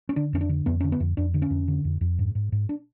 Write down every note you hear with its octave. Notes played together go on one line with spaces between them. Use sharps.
C#4
D3 D4
F2 C#4
D4
D3
F2 B3
D3 C#4
B3
F2
F2 D4
D3
C#4
F2
D3
F2
F2
G#2
G#2
G#2
D4